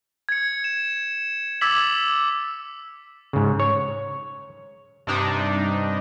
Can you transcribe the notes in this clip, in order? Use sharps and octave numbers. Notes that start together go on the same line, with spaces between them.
G#6 C#7
E7
D6 E6 G#6 A6 B6 F#7
G#2 C#3
C#5
G2 C3 D4 D#4